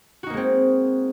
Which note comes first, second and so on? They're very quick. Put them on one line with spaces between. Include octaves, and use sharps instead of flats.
F#4 D#4 A#3 G#3 C4